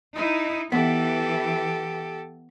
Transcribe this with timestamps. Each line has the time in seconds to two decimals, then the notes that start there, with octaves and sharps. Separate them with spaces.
0.16 D#4 E4
0.72 E3 B3 G4 A4